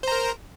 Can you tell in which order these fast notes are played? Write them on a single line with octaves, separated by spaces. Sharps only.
C5 A#5 A#4